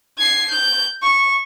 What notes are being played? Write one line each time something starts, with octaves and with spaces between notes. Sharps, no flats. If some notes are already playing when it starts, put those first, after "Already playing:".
G#6 C7
G6
C#6